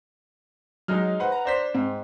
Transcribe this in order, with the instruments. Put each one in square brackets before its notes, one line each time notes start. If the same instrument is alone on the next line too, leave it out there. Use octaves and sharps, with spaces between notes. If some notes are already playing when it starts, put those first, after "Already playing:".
[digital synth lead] F#3 [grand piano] G#3 D#4 F6
[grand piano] B4 F#5 [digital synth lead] C5
[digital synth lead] A#5
[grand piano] D4 C5 B6
[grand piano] G#2 [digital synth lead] C4